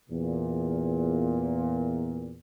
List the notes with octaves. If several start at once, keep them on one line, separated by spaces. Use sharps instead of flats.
E2 A#2